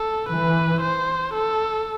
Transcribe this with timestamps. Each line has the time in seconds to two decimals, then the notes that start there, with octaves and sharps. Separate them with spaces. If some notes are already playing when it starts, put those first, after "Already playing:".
Already playing: A4
0.28 E3 B4
0.81 C5
1.34 A4